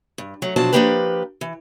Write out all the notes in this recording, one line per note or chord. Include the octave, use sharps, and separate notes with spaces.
G2
F#3 A3
B2 F3 F#3 D4 C5 A5
F3 G3 A#3 D4 G4 B4
E3